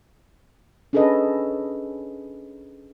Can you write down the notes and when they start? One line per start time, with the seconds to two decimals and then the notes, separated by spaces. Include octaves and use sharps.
0.93 C#4 D4 G#4 A4 B4 D#5